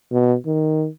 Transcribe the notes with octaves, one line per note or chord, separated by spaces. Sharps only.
B2
D#3